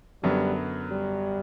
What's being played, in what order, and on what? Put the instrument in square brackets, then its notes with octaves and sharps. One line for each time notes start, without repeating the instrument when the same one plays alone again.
[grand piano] F#2 D3 F#3 B3 [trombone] G3
[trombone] G3